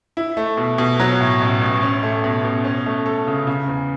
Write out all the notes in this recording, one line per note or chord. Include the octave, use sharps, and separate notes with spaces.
E4
A3
B2
B2
F#3
A2
A1
A1
C#4
A3
B2
B2
C#4
A3
A4
C#3
C#3
E2